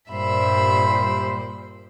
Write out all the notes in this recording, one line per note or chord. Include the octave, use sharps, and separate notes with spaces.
G2 A#2 G3 C5 E5 B5